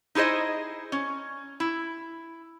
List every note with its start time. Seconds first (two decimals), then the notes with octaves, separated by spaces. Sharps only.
0.15 D#4 E4 G#4 C5 D#5
0.92 C#4
1.60 E4